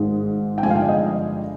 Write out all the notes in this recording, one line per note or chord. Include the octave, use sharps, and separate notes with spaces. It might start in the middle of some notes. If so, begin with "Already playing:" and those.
Already playing: G#1 G#2 D#3 G#3
G5
G1 G2 F3 G#3 G#5
F5
G5
D5
D#5